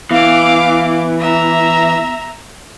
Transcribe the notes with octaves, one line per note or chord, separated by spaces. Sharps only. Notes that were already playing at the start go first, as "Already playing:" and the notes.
E3 B3 F5 D6
E5 A#5